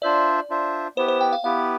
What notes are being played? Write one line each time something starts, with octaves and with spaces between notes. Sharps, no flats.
D4 F4 C5 D5 E5
D4 F4 C5 E5
B3 E4 G4 B4 C5
C5
G5
F5
B3 E4 G4 B4 F5